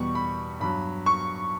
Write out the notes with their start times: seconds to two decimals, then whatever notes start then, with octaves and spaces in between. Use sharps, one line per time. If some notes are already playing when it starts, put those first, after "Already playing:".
Already playing: E2 B2 G3 C#6
0.15 B5
0.60 G2 F#3 B5
1.06 C#6